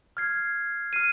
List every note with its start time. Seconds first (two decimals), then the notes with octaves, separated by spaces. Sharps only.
0.17 F6 G#6 C7
0.93 F6 C7 D#7